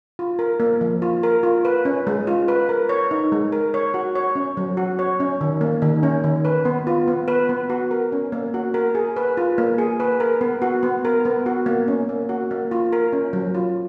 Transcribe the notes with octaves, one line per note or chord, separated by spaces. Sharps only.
F4
A#4
A#3
F3
F4
A#4
F4
B4
C#4
G#3
F4
B4
A#4
C#5
D#4
G#3
A#4
C#5
F#4
C#5
C#4
F#3
F#4
C#5
C#4
D#3
A#3
D#3
C#4
D#3
B4
B3
F4
B3
B4
B3
F#4
A#4
C#4
A#3
F#4
A#4
G#4
B4
F4
A#3
G#4
B4
A#4
B3
F#4
B3
A#4
B3
F#4
A#3
C#4
A#3
F#4
A#3
F4
A#4
C#4
F#3
F4